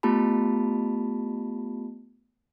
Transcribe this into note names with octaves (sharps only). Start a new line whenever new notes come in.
A3 B3 F4 G4 A5 B5